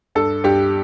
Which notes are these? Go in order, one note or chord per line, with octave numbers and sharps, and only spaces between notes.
G2 A4
G2 G4